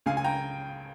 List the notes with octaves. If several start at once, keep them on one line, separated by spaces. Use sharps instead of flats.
C#2 C#3 F5 G#5
G#5
G5 A#5